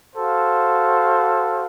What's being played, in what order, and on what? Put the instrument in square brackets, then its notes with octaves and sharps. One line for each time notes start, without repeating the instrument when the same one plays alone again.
[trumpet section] F#4 A4 C5 F5